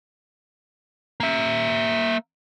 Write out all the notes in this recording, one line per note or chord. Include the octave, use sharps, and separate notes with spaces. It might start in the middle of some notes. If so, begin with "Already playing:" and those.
A#3 E5